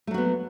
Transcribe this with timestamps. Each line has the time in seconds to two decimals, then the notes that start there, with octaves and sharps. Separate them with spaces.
0.07 A3
0.11 F#3
0.14 F#4
0.18 B3